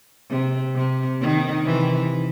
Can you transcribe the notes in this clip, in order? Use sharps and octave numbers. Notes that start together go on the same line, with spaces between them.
C3
C3
D#3
C3 E3